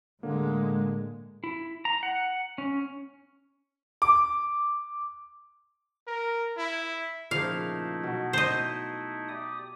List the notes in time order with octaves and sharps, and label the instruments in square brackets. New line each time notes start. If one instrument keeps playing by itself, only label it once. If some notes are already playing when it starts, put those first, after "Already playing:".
[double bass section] A2 G#3 [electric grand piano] D3 A#3
[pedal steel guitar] E4
A#5
F#5
C#4
[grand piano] D6
[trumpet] A#4
E4
[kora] A#2 C#3 F3 [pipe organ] A3 D#4 E4 [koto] F5
[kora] B2 F#3
[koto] C5 D#5
[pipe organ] G4 D5 D#6